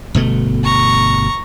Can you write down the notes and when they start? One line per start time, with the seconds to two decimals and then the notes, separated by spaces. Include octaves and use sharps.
0.15 G1 B2 A3
0.64 A#5 C#6